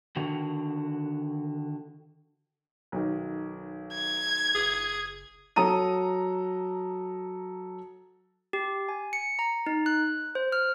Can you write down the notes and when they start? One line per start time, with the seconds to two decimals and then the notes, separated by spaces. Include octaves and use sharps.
0.16 D3 D#3 F#4
2.92 B1 D#3
3.94 G#6
4.55 F#1 G#4
5.56 F#3 A4 A#5 D#6 D#7
8.53 G4
8.89 G#5
9.13 C#7
9.39 A#5
9.66 D#4
9.86 F#6
10.35 C5
10.52 F6